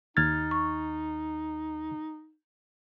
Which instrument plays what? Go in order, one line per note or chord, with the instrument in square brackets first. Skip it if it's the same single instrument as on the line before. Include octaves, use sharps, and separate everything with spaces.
[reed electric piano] D#2 F6 A6 [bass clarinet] D#4 [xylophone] G#6
[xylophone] C#6